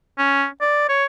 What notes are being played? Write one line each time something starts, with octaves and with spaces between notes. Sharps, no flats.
C#4
D5
C#5